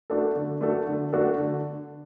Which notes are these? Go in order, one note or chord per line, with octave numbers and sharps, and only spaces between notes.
A3 D4 F#4 A4
D3
A3 D4 F#4 A4
D3
A3 D4 F#4 A4
D3